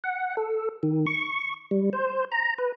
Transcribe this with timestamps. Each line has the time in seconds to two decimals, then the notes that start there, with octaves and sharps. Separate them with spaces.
0.04 F#5
0.37 A4
0.83 D#3
1.07 C#6
1.71 G3
1.93 C5
2.32 A#5
2.58 B4